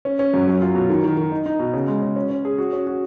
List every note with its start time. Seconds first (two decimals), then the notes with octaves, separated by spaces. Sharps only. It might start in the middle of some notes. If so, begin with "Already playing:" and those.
0.05 C#4
0.19 C#4
0.34 F#2
0.47 F#3
0.62 F4
0.75 B2
0.90 D#3
1.04 D#3
1.17 D#3
1.32 D#4
1.46 D#4
1.59 B2
1.74 C#3
1.87 G#3
2.02 C#3
2.16 C#4
2.29 C#4
2.45 G#4
2.58 F#4
2.73 C#4
2.87 F#4